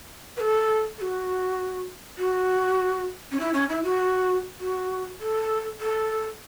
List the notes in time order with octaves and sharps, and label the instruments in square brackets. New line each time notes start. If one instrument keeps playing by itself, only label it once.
[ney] B4
A4
A4
F#4
F#4
C#4
E4
C#4
E4
F#4
F#4
A4
A4